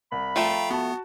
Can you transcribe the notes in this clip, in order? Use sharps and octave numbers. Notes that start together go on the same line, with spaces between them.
C2 B5
F3 A3 F5 G5 A#5
B3 F#4 A5